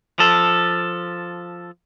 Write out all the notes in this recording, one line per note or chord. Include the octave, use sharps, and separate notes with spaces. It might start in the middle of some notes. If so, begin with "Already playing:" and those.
F3 A4